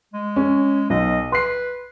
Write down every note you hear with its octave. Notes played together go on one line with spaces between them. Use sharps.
G#3
C#4
B1 D#5
B4 C6 C7